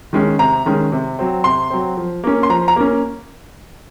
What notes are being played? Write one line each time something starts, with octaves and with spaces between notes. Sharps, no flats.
D#3 G#3 C#4
C3 A#5
D#3 G#3 C#4
C3
F#3 C4
C3 C6
F#3 C4
F3
A#3 C#4
C6
F3 A#5
A#5
A#3 C#4